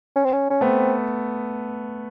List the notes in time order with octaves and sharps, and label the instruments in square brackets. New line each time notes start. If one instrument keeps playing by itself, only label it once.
[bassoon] C#4
C4
C#4
C#4
[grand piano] A3 B3 [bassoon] C4